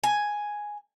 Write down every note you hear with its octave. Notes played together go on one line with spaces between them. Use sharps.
G#5